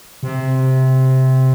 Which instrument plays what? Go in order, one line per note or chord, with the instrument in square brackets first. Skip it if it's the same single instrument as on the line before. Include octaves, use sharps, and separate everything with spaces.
[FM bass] C3